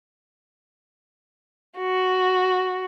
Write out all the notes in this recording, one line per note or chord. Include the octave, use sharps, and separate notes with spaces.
F#4